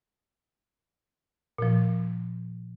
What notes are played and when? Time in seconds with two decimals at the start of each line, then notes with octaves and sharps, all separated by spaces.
1.58 A#2 F3